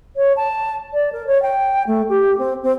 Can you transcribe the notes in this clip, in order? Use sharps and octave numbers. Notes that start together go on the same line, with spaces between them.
C#5
A5
D5
A#4
C#5
G5
A3
G4
C4
C4